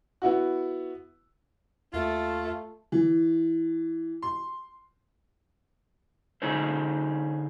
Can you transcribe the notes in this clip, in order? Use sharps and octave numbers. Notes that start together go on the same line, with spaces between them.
B3 E4 F#4
D#2 A3 F4
E3
C6
D3 D#4 G#4 A4 C5